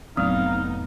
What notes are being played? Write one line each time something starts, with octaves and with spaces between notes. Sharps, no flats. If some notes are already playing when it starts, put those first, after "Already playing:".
F1 A2 F#3 B3 C4 D#4 F5